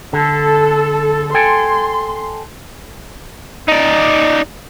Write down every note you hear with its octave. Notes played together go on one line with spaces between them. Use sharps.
D3 A4
A4 G5 G#5 C6
D#4 D5